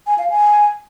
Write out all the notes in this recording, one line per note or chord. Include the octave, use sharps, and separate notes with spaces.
G#5
F5
G#5